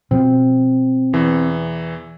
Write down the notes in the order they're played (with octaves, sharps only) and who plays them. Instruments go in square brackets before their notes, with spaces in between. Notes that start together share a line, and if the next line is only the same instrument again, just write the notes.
[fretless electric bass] B2 F3 [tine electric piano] C4
[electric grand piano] E2 E3